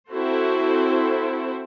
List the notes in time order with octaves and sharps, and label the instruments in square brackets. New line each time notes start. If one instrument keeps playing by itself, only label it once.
[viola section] C4 E4 F#4 A4 C5